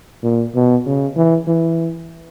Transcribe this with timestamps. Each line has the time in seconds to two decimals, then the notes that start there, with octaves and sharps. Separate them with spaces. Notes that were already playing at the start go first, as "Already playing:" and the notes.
0.23 A#2
0.55 B2
0.86 C#3
1.16 E3
1.47 E3